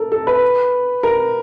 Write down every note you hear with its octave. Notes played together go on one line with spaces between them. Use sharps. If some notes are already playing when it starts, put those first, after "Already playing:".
Already playing: A4 A#4
A4
B4
A#4